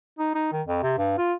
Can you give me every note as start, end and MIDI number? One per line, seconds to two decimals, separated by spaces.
0.19 0.32 63
0.35 0.51 63
0.52 0.62 51
0.67 0.80 41
0.83 0.94 48
0.98 1.16 43
1.18 1.34 65